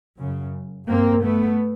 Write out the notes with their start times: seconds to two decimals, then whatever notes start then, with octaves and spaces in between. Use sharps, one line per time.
0.19 F#2 C#3
0.89 G2 A#3 C4
1.24 A3 B3